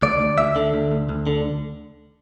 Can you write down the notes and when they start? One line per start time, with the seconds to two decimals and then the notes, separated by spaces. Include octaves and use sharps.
0.03 D2 D5
0.20 D2
0.38 D2 E5
0.56 D3
0.74 D2
0.92 D2
1.09 D2
1.27 D3